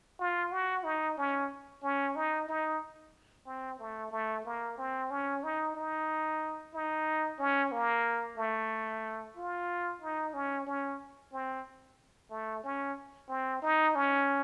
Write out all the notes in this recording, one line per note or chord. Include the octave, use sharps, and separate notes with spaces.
F4
F#4
D#4
C#4
C#4
D#4
D#4
C4
A3
A3
A#3
C4
C#4
D#4
D#4
D#4
C#4
A#3
A3
F4
D#4
C#4
C#4
C4
A3
C#4
C4
D#4
C#4